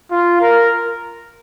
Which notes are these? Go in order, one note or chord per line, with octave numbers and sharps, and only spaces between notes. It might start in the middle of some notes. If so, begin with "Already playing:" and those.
F4
A#4